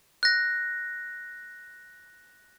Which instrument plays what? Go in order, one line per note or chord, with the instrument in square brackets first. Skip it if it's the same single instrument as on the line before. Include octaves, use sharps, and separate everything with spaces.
[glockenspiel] F#6 A#6